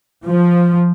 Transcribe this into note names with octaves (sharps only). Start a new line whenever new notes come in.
F3